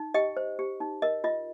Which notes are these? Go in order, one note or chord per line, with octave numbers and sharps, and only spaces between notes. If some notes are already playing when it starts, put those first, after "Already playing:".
Already playing: D#4
G4 D#5 G5
C5
G4
D#4
A#4 D#5
F4 D#5